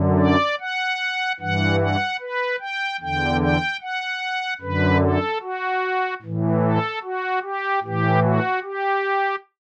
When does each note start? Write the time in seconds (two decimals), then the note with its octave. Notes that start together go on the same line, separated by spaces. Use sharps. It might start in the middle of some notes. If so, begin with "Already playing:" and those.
Already playing: F#2 D3
0.19 D5
0.60 F#5
1.40 G2 E3 F#5
1.80 F#5
2.20 B4
2.60 G5
3.01 E2 D3 G5
3.41 G5
3.81 F#5
4.61 F#2 D3 B4
5.02 A4
5.42 F#4
6.23 A2 E3
6.63 A4
7.03 F#4
7.43 G4
7.83 A2 E3 G4
8.23 F#4
8.63 G4